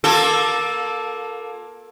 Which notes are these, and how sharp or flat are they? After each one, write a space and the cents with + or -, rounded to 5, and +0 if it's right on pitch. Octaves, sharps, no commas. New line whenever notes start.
A#3 +20 F4 +40 A4 +0